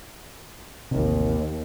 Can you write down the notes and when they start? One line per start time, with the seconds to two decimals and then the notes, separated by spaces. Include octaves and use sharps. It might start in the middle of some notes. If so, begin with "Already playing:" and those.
0.91 A1 D#2 C3